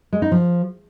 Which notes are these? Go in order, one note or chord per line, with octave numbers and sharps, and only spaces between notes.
G#3
D#4
F3